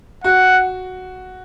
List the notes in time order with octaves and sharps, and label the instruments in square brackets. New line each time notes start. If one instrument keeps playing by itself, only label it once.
[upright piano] F#4 [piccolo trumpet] F#5